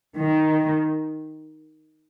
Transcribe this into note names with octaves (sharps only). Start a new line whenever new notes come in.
D#3